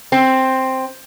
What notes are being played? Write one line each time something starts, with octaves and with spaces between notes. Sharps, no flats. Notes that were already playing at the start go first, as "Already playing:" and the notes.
C4